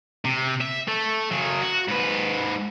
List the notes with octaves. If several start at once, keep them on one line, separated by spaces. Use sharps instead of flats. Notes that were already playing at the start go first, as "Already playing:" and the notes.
C3
E5
A3
C#3 F#3
F#4
G#2 B4